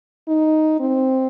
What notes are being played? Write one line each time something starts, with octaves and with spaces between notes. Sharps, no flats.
D#4
C4